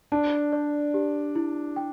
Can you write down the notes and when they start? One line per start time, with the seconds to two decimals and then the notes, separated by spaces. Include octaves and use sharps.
0.12 D4 A5
0.53 D5
0.94 G4
1.35 E4
1.76 G5